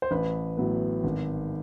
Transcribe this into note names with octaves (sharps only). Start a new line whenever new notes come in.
C5
A1 B4
A2 F#3 B3
G#1